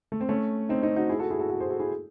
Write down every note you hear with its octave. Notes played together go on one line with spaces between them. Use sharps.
A3
C4
A3 C#4
C4 D#4
C4 D#4
D#4 F#4
E4 G#4
F#4 A4
E4 G#4
F#4 A4
F#4 A4
G#4 C5
F#4 A4
E4 G#4